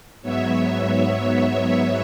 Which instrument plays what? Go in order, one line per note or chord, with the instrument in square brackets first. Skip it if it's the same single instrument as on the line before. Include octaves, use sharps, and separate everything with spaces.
[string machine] G#2 F#3 B3 C#5 E5